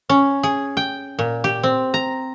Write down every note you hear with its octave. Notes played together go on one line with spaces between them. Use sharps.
C#4
G#4
G5
A#2
G4
C4
A#5